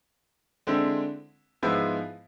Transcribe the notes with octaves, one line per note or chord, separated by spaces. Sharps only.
D3 G#3 C4 E4
G#2 F3 G#3 B3 E4